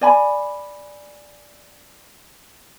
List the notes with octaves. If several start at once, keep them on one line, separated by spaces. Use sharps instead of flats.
D5 G#5 B5